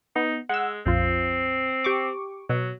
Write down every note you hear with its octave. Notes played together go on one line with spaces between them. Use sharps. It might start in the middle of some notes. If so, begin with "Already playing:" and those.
B3 D#4
G#3 F#5 E6
A#1 F2 C4 F4
G4 C#6 D6
B2 F#3